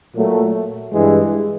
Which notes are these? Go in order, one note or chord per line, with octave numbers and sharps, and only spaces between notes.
A#2 F#3 A3
G2 E3 G#3